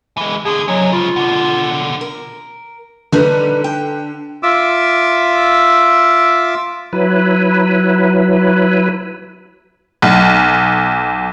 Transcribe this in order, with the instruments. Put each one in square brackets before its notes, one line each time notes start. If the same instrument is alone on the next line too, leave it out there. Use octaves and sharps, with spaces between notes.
[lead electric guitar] E3 G#3
[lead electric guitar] D#2 D3 [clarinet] G#4
[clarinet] F#3 [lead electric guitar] C#4 D#4
[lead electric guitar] C#3 F3 [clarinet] F4
[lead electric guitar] B2 D3
[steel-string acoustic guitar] A#4
[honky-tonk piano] D3 [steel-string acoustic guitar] G3 D#4 B4
[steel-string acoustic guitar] G5
[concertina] F4 E5 D6 E6
[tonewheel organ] F#3 E4 B4
[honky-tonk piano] B1